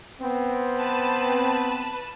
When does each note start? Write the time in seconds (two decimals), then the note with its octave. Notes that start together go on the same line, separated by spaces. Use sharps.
0.21 B3 C4
0.78 B4 A5